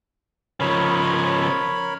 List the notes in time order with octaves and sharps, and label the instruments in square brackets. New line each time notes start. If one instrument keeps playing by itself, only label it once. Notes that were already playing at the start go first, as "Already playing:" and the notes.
[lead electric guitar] C#3 F3 [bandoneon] A#4 C#5 B5